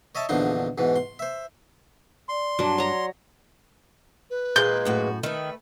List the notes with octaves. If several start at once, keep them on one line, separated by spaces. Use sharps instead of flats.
C#5 D#5 E5 A5
A#1 E2 D3 F3 D#4 C6
G#2 B2 E3
C6
C5 E5
D5 C6
G2 F#3 D4
C#5 A#5
B4
D#2 A#2 G#3 A#3 G6
F#2 A2 F#4
D#3 A3 B4